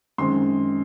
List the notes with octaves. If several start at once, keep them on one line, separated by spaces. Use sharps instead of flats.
F#2 D#3 G#3 C4 C6